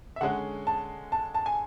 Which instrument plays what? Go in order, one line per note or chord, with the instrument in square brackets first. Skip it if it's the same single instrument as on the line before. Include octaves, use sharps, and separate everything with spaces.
[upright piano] E5
D3 G#3 C#4 F#5
A5
A5
A5
G#5